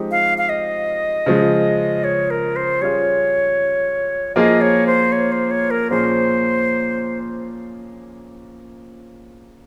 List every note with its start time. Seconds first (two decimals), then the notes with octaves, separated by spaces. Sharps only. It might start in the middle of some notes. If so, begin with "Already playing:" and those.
Already playing: F3 G#3 C4 D#4 G4
0.11 F5
0.38 F5
0.49 D#5
1.26 C#3 F3 G#3
2.04 C#5
2.30 A#4
2.56 C5
2.81 G3 C#4 F4 G#4 C#5
4.35 F3 A#3 F4 G#4 D#5
4.61 C#5
4.87 C5
5.12 C#5
5.32 C5
5.51 C#5
5.70 A#4
5.90 A#2 F3 A#3 C#4 G#4 C5